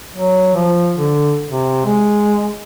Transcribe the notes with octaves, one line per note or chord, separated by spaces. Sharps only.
F#3
F3
D3
C3
G#3